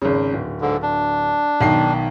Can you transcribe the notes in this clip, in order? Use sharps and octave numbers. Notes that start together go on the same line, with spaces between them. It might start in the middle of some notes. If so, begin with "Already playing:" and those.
G#1 C#3
D1
G#2 D3
D4
B1 D#3 C7